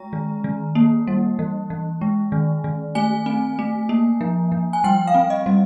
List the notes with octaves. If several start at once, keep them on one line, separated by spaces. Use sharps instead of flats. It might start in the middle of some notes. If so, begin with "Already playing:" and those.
Already playing: G#3 A#5
D#3
D#3
A#3
G3
E3
E3
G#3
D#3
D#3
A3 G#5
C4
A3
A#3
F3
F3
G#5
G3 G5
F5
C4
D#5
G3